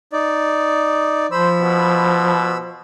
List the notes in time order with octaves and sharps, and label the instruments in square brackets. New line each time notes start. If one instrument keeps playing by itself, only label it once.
[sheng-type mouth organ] D#4 D5
[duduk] F3 [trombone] C5 [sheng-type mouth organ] B5 E6
[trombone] B2